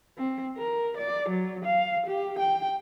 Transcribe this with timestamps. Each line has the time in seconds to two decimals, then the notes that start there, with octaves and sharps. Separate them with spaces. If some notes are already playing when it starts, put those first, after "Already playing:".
0.18 C4
0.57 A#4
0.98 D5
1.30 F#3
1.65 F5
2.07 G4
2.39 G5